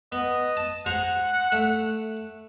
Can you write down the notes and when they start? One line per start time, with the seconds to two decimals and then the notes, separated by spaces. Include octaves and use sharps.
0.12 B3 D#5
0.57 A5
0.86 G#4 C5 F#5 A#5
1.52 A3